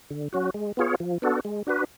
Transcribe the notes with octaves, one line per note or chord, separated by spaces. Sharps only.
D3
F#3 C#4 F#4
G#3
B3 F4 G#4 C#5
F3
B3 D4 F#4 A4
G#3
D4 F#4 B4